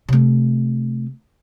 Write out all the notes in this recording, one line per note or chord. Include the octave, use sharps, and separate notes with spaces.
C3 A3